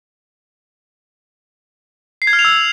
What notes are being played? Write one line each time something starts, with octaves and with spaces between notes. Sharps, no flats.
C7
G#6
F6
F7
E6